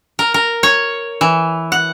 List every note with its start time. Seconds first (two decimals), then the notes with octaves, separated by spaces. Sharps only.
0.19 A#4
0.34 A#4
0.63 C#5
1.21 E3
1.72 F#5